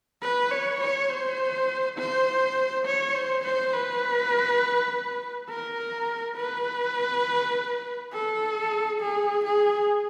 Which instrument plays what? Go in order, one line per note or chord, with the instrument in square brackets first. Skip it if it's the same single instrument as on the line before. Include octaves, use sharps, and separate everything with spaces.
[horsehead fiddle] B4
C#5
C#5
C5
C5
C#5
C5
C5
B4
A#4
B4
A4
G#4
G#4